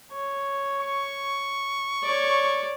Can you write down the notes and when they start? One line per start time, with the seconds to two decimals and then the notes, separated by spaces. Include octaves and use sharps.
0.12 C#5
0.81 C#6
2.03 C#5 D5